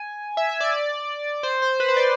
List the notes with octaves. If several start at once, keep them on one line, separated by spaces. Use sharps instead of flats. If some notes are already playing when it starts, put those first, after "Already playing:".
Already playing: G#5
E5
E5
D5
C5
C5
B4
C5
D5